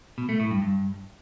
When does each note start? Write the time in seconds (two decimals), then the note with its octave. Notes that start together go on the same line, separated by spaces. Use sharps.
0.18 B2
0.29 A3
0.40 A2
0.51 G2
0.62 G2